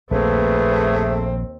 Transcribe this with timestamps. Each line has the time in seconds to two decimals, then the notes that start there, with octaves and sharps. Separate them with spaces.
0.11 A#1 D#2 A3 C4 G#4 B4